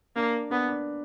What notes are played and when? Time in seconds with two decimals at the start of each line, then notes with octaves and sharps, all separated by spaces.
0.16 A#3 D4
0.50 B3 D4
0.69 D4